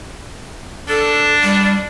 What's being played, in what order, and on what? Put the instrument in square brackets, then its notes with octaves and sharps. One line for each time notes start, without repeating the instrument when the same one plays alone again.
[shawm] D4 [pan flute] A4
[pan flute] G3